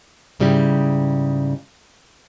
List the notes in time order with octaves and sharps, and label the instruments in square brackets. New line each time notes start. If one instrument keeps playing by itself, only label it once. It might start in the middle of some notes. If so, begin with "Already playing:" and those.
[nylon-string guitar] G#2 C#3 G3 E4 G4